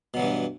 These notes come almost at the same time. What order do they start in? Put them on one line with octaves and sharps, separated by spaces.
B2 F#3 E3 G2